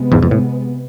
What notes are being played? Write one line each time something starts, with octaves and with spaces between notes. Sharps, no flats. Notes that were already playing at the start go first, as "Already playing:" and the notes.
Already playing: C3 G#3 B3
E2 G#2
F2
A2